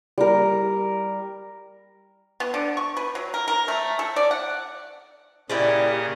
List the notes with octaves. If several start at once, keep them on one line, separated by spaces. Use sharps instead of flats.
G3 A#4
B3
D3
C#6
B4
F#3
A#4
A#4
A3
A4
D5
F#5
A#2 C#3 E4 G4 D5 D#5